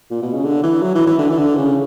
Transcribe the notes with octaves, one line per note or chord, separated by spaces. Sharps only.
A#2
B2
C#3
D3
E3
F#3
E3
E3
D3
E3
D3
C#3